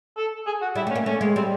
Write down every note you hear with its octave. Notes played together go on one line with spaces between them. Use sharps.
A4
G#4
F#4
G3 E4
A3
C#4
A#3
A3 C#4
G#3
G3 C4